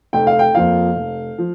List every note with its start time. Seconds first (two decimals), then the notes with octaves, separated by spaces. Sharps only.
0.13 F1 G5
0.27 F5
0.39 G5
0.55 F2 F3 A#3 F5
0.96 F1
1.38 F3